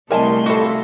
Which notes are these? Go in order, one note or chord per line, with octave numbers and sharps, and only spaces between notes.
C2 A3 E4 A#4 D#5 G#5 A5 C6
F3 G3 E4 F#4 A4